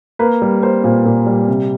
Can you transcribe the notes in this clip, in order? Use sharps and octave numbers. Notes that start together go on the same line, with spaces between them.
A#3 B4
G3
A#3 C5
A#2 C5
A#2
G3
C3